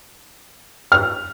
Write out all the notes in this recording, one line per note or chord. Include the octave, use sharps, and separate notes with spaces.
F6